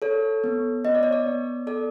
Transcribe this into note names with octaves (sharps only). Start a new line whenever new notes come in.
A4 C#5
B3
B3 D#5
D5
C#5
D5
B3
A4 D5